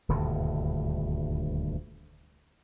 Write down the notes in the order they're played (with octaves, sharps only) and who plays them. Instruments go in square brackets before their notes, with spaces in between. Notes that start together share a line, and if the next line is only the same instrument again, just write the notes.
[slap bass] D#1 D2 G2 B2